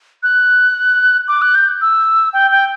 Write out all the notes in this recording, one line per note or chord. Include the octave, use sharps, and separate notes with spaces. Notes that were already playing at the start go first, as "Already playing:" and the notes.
F#6
D6
F#6
G6
E6
G5
G5